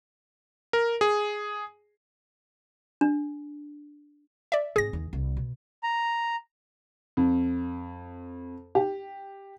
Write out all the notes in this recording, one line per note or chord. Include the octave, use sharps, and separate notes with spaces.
A#4
G#4
D4
D5 E5
G#2 C4 G#4 A#6
D#2
C2
B2
A#5
F2
G4